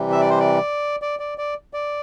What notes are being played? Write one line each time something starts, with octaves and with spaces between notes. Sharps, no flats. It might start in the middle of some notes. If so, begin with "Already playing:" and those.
Already playing: C3 E3 G3
E5
D5
C5
D5
D5
D5
D5
D5